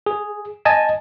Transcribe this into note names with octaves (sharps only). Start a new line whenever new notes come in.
G#4
D#5 G#5 A5 G#6